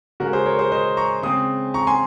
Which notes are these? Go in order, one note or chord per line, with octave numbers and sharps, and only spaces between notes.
C#3 G#3 C#4 F#4 A#4
G#4 C5
A#4 C#5
G#4 C5
C5 D#5
A#5 C#6
C#3 G#3 C4 C6 D#6
A#5 C#6
G#5 C6